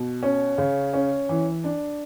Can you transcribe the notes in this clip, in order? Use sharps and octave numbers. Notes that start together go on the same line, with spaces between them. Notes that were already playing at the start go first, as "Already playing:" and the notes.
Already playing: B2
C#4
C#3
C#4
E3
D4